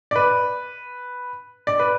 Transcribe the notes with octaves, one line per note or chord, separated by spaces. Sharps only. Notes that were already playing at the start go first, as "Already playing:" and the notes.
D5
B4
D5
B4